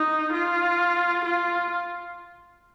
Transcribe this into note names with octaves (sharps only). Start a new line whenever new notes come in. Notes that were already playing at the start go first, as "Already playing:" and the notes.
Already playing: D#4
F4
F4